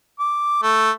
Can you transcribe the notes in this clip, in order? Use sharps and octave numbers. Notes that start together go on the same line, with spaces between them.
D6
A3